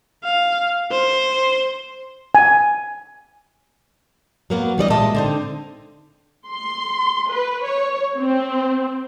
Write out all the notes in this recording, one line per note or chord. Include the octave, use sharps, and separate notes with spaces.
F5
C5
G#5
F#3 A#3 B3
E3 G3 D5 D#5
A#2 G#3 D#5 E5 A5
D3 C4 D#4
C6
B4
C#5
C4